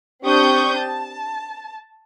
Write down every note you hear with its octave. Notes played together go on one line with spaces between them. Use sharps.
C4 D4 G4 C#6 D#6 G6
A5